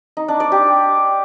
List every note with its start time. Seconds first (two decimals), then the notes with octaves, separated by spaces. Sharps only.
0.17 D#4
0.28 D4
0.40 D5
0.52 G4